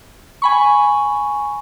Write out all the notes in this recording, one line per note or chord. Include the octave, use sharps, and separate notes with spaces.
G#5 B5 C#6